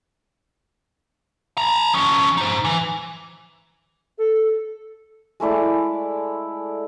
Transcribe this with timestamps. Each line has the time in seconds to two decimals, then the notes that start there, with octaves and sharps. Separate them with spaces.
1.58 A#5 B5
1.93 F3 C#4
2.37 D#4 C5
2.65 E3
4.18 A4
5.40 G#3 A3 E4 D5